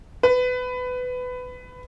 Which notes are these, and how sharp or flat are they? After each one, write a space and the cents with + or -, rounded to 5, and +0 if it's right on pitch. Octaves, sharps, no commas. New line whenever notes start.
B4 +20